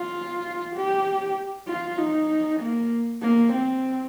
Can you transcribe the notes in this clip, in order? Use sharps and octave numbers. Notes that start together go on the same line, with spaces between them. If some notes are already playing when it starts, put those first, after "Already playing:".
Already playing: F4
G4
F4
D#4
A#3
A#3
C4